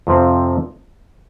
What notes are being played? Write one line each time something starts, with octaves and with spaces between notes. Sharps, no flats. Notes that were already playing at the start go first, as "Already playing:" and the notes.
F2 C3 F3 C4